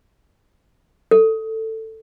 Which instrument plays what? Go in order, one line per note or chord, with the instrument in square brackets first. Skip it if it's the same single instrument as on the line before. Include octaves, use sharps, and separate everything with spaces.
[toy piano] A4